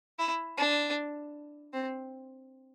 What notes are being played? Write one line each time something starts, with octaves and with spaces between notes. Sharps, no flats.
E4
D4
C4